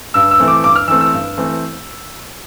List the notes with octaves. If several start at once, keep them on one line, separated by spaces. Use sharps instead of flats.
G2 E6
E6
E3 A3 C4
D6
G2 D6
F6
E3 A3 C4 E6
E6
G2
E3 A3 C4